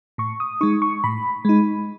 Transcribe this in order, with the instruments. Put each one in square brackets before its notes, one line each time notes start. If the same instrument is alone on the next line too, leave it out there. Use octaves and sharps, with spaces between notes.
[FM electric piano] A2 C#6
D#6
G#3 D#4 C#6
C#6
A2 B5
G#3 D#4